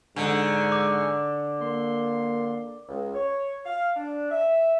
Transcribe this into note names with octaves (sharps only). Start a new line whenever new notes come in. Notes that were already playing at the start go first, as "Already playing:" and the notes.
G#2 D3 D#4 G#5 C#6
D6
A#3 C6
C#2
C#5
F5
D4
E5